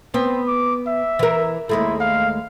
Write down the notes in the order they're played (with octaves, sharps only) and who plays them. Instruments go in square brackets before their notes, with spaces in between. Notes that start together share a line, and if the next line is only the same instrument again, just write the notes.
[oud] B3 [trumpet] C4
[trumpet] D6
E5
[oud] E3 A#4
[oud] D#2 G#3 A3 [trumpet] E4
[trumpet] F5